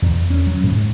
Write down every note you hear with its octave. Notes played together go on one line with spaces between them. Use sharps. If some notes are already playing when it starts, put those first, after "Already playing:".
E2
C#4
F#3
G#2